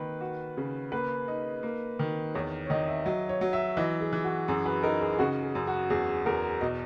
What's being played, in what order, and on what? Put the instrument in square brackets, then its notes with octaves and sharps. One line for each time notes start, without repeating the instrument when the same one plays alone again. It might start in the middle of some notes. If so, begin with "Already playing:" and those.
Already playing: [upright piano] D#3 A#3 [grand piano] B4
[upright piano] F#4
C#3
[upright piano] A#3 [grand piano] B4
[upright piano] D#4
A#3
D#3
[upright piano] E2 [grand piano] C#5
[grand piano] C#5
[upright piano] D#3 [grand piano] D#5
[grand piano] E5
[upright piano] F#3 [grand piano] D#5
[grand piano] C#5
[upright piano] F#3
[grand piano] E5
[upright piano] E3 [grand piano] D#5
[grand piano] G#4
[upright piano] E3
[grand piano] F#4
[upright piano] F#2 [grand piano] G#4
[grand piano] B4
[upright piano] D#4 [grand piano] A#4
[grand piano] G#4
G#4
[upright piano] C#3 [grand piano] F#4
[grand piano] G#4
[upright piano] F#2
[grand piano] F#4
[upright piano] E2 [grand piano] G#4
[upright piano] E2 [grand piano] A#4
[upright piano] B2 [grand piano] D#5